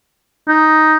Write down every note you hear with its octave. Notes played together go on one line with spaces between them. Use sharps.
D#4